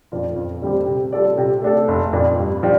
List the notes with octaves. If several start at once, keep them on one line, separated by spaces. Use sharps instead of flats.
F2 F3 D4 F4
F2
D3 G3 C4 G4
C3
G3 F4 A4 D5
C3
A3 D4 A4
F1
F2 F3 D4
G2
F3 D4 G4